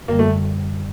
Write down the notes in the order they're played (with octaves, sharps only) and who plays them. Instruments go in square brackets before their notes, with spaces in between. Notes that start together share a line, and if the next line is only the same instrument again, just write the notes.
[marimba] F#2 D3 G3 [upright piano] A#3
[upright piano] A3